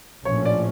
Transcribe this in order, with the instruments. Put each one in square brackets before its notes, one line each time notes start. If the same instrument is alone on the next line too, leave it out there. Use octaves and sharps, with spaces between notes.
[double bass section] A#1 A2 F3 C#4 [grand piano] C#5
[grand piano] D5